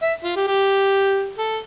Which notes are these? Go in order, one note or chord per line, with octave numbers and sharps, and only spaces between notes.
E5
F4
G4
G4
A4